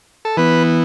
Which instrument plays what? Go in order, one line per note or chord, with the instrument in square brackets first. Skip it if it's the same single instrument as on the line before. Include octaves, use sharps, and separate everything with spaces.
[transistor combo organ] A4
E3 B3 B4